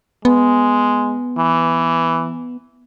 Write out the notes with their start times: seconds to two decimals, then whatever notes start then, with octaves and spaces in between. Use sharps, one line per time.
0.25 G#3 B3
1.38 E3